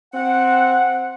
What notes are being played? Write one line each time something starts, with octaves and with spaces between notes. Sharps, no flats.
C4 F#5